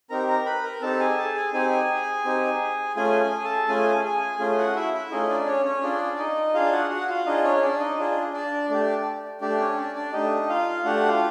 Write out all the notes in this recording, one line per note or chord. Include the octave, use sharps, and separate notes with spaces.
C4 D#4 G4 A#4 A#5
A#4 A#5
B4 B5
A#4 A#5
C4 D#4 G4 A4 A5
G#4 G#5
A4 A5
G#4 G#5
C4 D#4 G4 G#4 G#5
C4 D#4 G4
A3 C#4 F4 G#4 G#5
G#4 G#5
A4 A5
A3 C#4 F4 G#4 G#5
G#4 G#5
A3 C#4 F4 G#4
F#4 F#5
E4 E5
E4 E5
A3 C#4 D#4 F4 G#4 D#5
D4 D5
C#4 C#5
C#4 C#5
D4 F4 G#4 D5
D#4 D#5
D4 F4 G#4 F5
F#4 F#5
F#4 F#5
F4 F5
D4 D#4 F4 G#4 D#5
C#4 C#5
D4 D5
D#4 D#5
D4 F4 G#4
D4 D5
A3 D4 G4 D5
A3 D4 G4 D5
C#4 C#5
D4 D5
D4 D5
A3 D4 D#4 G4 D#5
F4 F5
A3 D4 F#4 G4 F#5
F4 F5